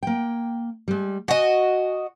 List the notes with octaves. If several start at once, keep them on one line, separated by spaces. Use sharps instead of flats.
A#3 G5
G3 G#3
F#4 D#5 G#5